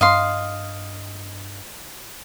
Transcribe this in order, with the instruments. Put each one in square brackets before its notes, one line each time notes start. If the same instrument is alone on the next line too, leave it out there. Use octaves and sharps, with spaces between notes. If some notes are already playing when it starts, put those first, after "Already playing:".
[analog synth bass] G2 [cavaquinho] D#5 F5 C6